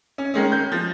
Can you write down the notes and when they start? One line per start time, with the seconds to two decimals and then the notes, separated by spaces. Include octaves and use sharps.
0.18 C#4
0.34 D#3 G#3 C#4
0.52 G6
0.72 F3